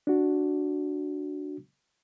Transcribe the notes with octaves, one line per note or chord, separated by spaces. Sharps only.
D4 F#4